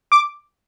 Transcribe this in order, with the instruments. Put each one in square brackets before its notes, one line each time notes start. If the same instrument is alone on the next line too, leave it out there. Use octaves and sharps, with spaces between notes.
[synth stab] D6